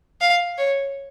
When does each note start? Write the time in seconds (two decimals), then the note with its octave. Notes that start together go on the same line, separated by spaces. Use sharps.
0.21 F5
0.58 C#5